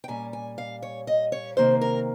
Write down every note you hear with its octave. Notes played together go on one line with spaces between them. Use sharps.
G5
A#2 G3 C#4 G#5
G#5
F5
C#5
D#5
C#5
C3 D#3 A#3 C5
A#4